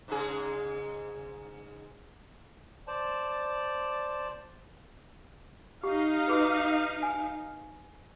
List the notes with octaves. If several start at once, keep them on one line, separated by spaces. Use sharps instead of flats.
G#2 C#3 G#4
C5 D5 A5
D#4 G4 F5
F#4 G#4 B4
G#5